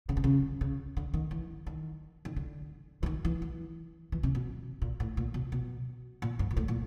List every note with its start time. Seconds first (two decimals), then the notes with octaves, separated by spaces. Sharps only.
0.09 C#3
0.17 C3
0.24 C#3
0.61 C#3
0.97 D3
1.14 D#3
1.31 E3
1.67 D#3
2.25 D#3
2.36 D3
3.03 E3
3.06 D#3
3.25 E3
3.42 E3
4.12 E3
4.23 C3
4.35 B2
4.82 A#2
5.00 A2
5.17 A#2
5.34 B2
5.52 B2
6.22 A#2
6.39 G2
6.51 A#2
6.57 A2
6.68 A#2